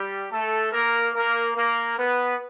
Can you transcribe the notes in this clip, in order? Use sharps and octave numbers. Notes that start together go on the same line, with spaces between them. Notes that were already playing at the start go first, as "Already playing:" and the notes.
Already playing: G3 G4
A3 A4
A#3 A#4
A#3 A#4
A#3 A#4
B3 B4